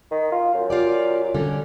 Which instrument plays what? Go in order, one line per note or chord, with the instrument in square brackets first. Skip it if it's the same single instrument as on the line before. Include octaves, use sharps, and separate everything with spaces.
[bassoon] D#3
F4
F#2
[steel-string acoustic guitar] F4 G4 D5
D3 G3 C#4